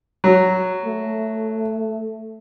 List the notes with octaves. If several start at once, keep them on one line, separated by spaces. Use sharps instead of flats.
F#3
A3